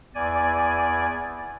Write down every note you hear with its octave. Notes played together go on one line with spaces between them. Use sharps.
E2 D5 G#5